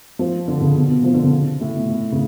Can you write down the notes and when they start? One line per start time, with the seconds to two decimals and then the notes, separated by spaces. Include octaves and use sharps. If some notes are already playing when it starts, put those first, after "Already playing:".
0.19 F3
0.48 D3
0.61 C#3
0.76 B2
0.90 B2
1.04 F3
1.14 D3
1.23 C#3
1.61 A2
1.75 B2
1.89 A2
2.12 C#3